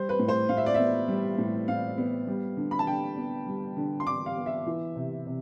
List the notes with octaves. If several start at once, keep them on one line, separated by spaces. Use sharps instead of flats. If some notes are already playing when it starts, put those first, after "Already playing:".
Already playing: G3 C5
B4
A2
C5
A2 F5
E5
D5
B3 E5
G3
A2
A2 F5
B3
G3
D3
B5
A5
D3 G5
B3
G3
D3
C6
D3 D6
F5
B3
E5
E3
C3
C3